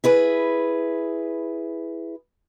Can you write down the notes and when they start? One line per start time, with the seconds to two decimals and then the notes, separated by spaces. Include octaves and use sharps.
0.04 E4 G#4 B4